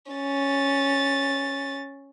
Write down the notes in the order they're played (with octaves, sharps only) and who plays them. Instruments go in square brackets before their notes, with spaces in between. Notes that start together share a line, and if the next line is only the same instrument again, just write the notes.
[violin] C#4 A6